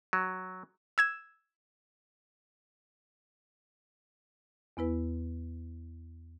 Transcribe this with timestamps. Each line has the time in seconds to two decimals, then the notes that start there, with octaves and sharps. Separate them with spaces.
0.13 F#3
0.98 E6 G#6 E7
4.77 E2 B3 E4 B4